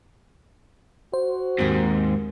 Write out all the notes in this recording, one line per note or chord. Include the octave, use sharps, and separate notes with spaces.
F#4 C5
D#2 G#2 C4